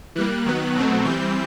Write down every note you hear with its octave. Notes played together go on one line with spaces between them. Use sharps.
E3 G3 A#3 F#6
D#3 F#3 B3
B2 F#3 A3 C4
E3 G3 C4 G6